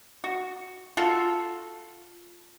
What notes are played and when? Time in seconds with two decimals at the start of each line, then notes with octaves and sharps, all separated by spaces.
0.24 F#4
0.97 F4 F#4 A4